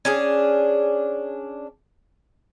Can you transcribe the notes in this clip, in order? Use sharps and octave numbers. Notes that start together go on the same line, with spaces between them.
C#4 D4 G#4